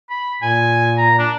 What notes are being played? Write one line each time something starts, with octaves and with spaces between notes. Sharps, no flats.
B5
A#2 G#5
A#5
D4